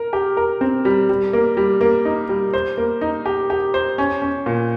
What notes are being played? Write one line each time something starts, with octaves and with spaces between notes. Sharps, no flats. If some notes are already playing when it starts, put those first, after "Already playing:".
Already playing: A#4
G4
A#4
C4
G3
G3
A#3
G3
A#3
D#4
G3
C5
A#3
D#4
G4
G4
C5
C#4
C#4
A#2